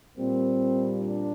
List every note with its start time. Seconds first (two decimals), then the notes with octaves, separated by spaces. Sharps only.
0.16 A#2 G3 A#3 C4
1.00 D4